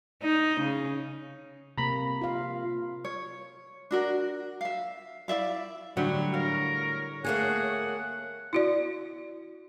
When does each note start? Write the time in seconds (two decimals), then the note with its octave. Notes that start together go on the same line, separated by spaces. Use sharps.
0.23 D#4
0.60 C#3
1.78 C3 A#3 A#5 B5
2.21 F4 F5
3.05 C#5
3.91 D4 F#4 A#4
4.61 E5 F5
5.28 E4 D5 E5 F5
5.97 A2 D3 F#3 G3
6.34 A#4 C#5 F5
7.24 A3 A#3 G#4 F#5
8.53 E4 F#4 D5